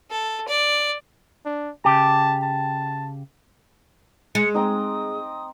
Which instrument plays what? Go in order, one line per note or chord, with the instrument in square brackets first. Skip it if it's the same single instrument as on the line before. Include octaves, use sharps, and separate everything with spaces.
[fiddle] A4
D5
[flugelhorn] D4
[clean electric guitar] C#3 G4 [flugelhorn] A5
[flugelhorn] A5
[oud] G#3 [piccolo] C#7
[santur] C4 D#4 [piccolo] D#6